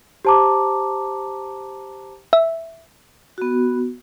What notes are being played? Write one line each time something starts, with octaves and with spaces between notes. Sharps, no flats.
G4 C5 A5 A#5 D6
E5
B3 F#4